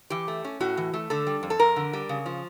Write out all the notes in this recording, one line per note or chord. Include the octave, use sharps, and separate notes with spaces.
E3 G4
A3
C#4
A2 F#4
E3
A3
D3 A4
G3
F2
A4
F2 A#4
D3
G3
C#3
F3